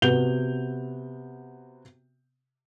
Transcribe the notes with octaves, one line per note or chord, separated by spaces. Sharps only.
C3 B3 F#4 G6 F7 G7